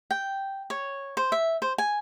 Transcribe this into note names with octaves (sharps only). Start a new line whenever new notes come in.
G5
C#5
C5
E5
C5
G#5